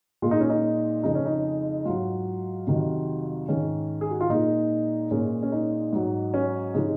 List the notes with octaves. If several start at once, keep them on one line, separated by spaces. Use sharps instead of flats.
A#2 G#3 F4
D#4
C#4
D#4
F2 C#3 F3 G#3 D#4
C#4
D#4
G#2 F#3 F4
F2 C3 D#3 F#3
G#2 D#3 G#3 C#4
G#4
F#4
F4
A#2 G#3 D#4
A#2 G#3 C#4
C#4
D#4
G#2 F#3
C#4
C3 F3 G#3 D#4